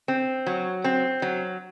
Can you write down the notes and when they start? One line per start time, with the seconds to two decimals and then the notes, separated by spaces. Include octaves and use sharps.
0.08 C4
0.46 F#3
0.84 C4
1.22 F#3